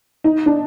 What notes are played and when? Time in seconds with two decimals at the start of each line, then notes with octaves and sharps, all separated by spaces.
0.24 D#4
0.46 D4